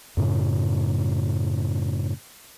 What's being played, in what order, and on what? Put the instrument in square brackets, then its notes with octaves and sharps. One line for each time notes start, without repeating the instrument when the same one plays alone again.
[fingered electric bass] F#2 A2 C#3